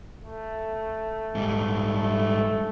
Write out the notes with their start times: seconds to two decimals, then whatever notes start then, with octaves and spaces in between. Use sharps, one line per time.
0.23 A3
1.35 G#2 G3
1.96 A3